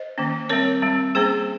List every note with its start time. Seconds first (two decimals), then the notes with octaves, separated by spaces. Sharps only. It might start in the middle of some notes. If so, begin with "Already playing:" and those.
Already playing: C5 D#5
0.18 D#3 A#3 C#4
0.49 G3 C4 A#4 C#5
0.82 G3 C4
1.15 G3 A#3 C#4 G#4 C5